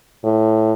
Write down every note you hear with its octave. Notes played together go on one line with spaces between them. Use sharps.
A2